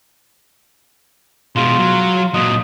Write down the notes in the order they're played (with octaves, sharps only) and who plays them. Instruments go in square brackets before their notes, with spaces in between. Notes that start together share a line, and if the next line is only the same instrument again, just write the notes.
[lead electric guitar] B2 G#3 [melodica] F4
[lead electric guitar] F#3
[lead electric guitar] A#2 F#3 [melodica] D#5